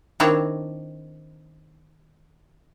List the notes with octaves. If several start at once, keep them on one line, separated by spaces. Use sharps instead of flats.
D#3 C4 D4 E4 C#5 A#5